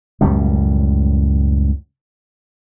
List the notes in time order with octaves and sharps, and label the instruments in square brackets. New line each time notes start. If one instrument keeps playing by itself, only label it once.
[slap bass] C#2 F#2 A2 G3